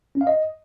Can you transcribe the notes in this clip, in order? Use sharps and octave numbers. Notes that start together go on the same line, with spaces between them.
C#4
F5
D#5